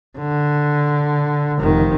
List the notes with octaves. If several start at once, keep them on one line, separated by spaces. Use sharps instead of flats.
D3
F1 D#3